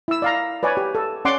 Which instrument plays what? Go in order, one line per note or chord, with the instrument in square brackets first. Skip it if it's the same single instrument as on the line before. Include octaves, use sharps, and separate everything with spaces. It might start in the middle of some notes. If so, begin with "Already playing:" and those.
[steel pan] E4 E6
D5 F5 A#5
B4 C#5 D5 G#5
G4
A4
C#4 D5 F#5 C6 D6